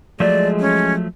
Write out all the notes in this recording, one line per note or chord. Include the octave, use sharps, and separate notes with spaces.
F3 F#3 G#3 A3 D5
C#4